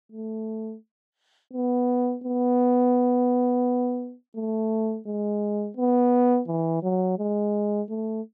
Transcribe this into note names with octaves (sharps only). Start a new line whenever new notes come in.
A3
B3
B3
A3
G#3
B3
E3
F#3
G#3
A3